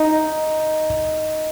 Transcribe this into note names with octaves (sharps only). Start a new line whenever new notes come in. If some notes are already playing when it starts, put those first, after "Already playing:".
Already playing: D#4